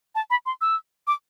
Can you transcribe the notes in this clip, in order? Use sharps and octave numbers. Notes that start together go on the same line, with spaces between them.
A5
B5
C6
E6
D6